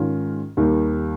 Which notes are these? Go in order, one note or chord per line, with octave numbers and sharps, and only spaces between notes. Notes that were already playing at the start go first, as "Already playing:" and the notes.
Already playing: G#2 D#3 G#3 C#4 F4
D#2 D#3 G3